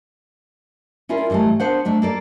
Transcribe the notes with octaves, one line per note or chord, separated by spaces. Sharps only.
C#4 E4 F4 A#4 D5
G#2 E3 F#3 G3 A3
B3 D4 C5 F#5
G#2 A3 D4
A#3 A4 D5